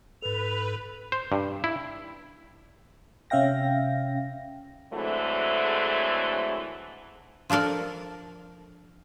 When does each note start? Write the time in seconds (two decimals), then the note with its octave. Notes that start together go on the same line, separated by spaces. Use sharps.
0.22 G#2 A4 B4 F7
1.12 C5
1.32 G2
1.64 E4
3.30 C3 C#4 E5 F5 G5 A#6
4.92 D3 E3 F#3 G#3 A3 C4
7.50 F3 D4 A4 A#4 D5